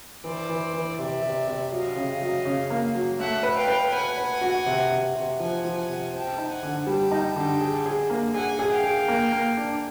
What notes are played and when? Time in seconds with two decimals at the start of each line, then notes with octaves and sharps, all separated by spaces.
0.24 E3 C5 D5
0.49 E3
0.73 E3
0.98 C3 D5 E5
1.22 C3
1.47 C3
1.72 F#3 D#5 F5
1.96 C#3
2.21 F#3
2.45 C#3
2.70 A#3
2.95 F#3
3.19 A3 E5 F#5
3.43 B4
3.56 F5 G5
3.68 B4
3.92 B4 F#5 G#5
4.18 B4
4.41 F#4
4.66 C3
4.91 C3
5.15 C3
5.40 F3 F#5 G#5
5.65 F3
5.76 F#5 G#5
5.89 C3
6.13 C4 G5 A5
6.38 D#4
6.50 F#5 G#5
6.63 D3
6.87 G3 G5 A5
7.11 D#4
7.36 D3
7.61 G#4
7.86 G#4
8.10 A#3
8.34 G#4 F#5 G#5
8.59 G#4
8.71 F5 G5
8.84 G#4
9.08 A#3
9.32 A#3
9.57 D4